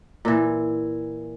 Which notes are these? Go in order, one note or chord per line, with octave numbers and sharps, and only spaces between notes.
A#2 E3